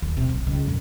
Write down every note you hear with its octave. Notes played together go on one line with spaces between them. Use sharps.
D#2
C3
D1 A#1
C#2 D#3
F2 A#2